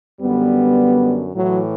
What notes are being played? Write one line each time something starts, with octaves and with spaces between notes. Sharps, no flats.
F#2 D3 G3 B3
A2 E3 F#3